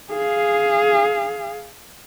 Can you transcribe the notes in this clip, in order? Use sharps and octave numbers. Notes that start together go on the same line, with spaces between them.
G#4 F5